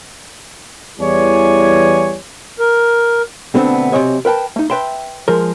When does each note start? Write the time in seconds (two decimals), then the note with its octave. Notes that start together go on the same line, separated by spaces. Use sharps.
1.00 E2 E3 G3 C#5 D5 G#5
2.59 A#4
3.54 B2 D3 A3 B3 C4 D4
3.92 B1 C3 A#3 C#5 D#5 G#5
4.25 A#4 B4 G5 A5
4.56 A3 D#4
4.70 B4 E5 G5 A5 C6
5.28 F3 G#3 G#4 A#4